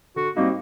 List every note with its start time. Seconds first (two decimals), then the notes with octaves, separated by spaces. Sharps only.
0.16 D3 F#4
0.35 G3 A#3 C4 D#4 F#4